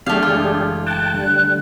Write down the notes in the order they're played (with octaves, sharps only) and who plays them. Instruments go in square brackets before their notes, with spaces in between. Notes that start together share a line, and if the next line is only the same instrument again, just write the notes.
[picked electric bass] F#3 B3 [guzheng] A3 F5 [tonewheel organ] D4 G4 G#4
[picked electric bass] F#1 E3 G#3 [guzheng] F4
[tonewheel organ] G5 A5 [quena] F#6
[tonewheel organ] D3 G3